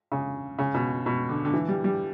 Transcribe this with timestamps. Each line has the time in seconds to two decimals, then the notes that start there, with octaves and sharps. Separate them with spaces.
0.12 C#3
0.59 C#3
0.74 B2
1.06 B2
1.29 D3
1.45 D3
1.54 E3
1.69 G3
1.84 G3